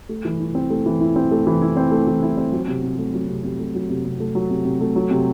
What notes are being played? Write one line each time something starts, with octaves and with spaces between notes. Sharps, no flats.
A3
E3
E4
C4
A3
E3
E4
C4
A3
E3
E4
C4
A3
E3
E4
C4
F#3
C3
C3
A3
F#3
C3
C3
A3
F#3
C3
C3
A3
F#3
C3
C3
A3
F#3
C3